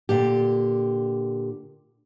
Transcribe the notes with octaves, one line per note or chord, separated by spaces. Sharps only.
A#2 D3 G4